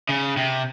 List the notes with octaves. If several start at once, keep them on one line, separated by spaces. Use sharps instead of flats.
C#3
C3